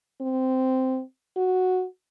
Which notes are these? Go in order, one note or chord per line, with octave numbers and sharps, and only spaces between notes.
C4
F#4